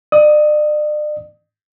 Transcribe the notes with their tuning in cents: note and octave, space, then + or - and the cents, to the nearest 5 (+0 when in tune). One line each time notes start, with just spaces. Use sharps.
D5 +40 D#6 +20